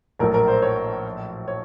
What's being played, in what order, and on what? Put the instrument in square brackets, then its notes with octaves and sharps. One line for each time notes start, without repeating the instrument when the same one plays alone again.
[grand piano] A#1 A2 F#3 A3 [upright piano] A#4
[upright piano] A#4
C5
C#5
C#5